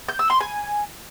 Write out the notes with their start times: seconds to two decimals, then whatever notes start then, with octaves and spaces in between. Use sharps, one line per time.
0.08 G6
0.19 E6
0.30 C6
0.41 G#5